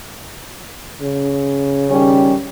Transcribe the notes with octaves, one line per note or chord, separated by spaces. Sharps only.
C#3
D#3 G3 C#4